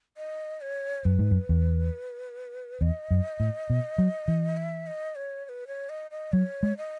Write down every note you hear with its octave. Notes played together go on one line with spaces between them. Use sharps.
D#5
C#5
F#2 B4
G#2
F#2
E2
E2 D#5
F#2
A2
B2
F#3
E3
E5
D#5
C#5
C#5
B4
C#5
D#5
D#5
F#3 C#5
G#3
D#5